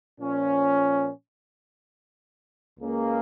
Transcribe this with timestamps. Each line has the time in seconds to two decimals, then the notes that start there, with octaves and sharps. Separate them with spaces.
0.18 A#2 F3 C#4
2.79 C#2 C#3 A#3 C#4 G#4